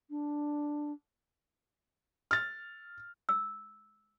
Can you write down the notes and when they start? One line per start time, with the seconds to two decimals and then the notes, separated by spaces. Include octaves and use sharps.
0.10 D4
2.31 F6 A6
3.29 E6